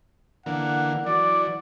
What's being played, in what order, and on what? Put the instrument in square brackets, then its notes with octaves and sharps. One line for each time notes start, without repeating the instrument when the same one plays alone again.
[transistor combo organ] D3 E3 A#3 [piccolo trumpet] F#5
[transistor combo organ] E3 F#3 [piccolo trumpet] D5